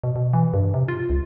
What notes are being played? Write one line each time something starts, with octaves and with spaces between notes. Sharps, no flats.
B2
B2
E3
G2
C3
F4
C#2